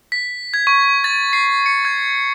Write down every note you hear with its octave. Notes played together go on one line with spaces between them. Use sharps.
B6
G#6
C#6
A6
C7
C#7
G#6